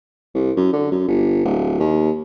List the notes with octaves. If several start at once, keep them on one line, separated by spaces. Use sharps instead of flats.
C2
F#2
D3
F#2
G1
D1
D#2